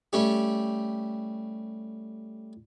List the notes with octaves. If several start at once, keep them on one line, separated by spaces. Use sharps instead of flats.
G3 A3 C#4 G4